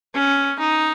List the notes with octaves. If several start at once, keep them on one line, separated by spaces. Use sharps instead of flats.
C#4
D#4